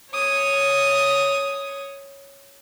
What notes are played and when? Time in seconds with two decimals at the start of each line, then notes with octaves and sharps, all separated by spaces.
0.13 C#5 D#6